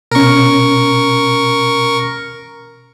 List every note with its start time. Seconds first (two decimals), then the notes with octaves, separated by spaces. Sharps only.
0.11 B2 C#4 A#4 C#6